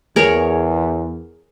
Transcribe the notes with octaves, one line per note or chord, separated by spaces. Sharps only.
E2 G#4 A#4 C#5